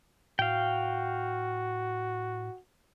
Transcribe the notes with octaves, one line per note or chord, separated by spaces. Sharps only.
A2 F#4 F5 G5